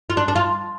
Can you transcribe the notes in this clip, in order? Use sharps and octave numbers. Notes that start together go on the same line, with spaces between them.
F4
D4
D4
F4